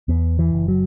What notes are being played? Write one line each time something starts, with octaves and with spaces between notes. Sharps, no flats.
E2 B3
E3
F#1
F#3